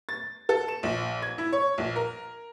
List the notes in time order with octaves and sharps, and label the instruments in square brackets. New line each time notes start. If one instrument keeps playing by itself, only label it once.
[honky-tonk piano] A6
A4
E7
A#1
G#6
E4
C#5
A#1
A#4